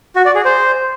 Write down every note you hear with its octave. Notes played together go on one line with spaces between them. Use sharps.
F#4
D5
G#4
C5